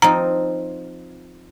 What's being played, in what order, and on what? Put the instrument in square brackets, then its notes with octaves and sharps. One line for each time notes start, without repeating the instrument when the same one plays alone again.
[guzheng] F3 C4 D#4 [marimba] A#5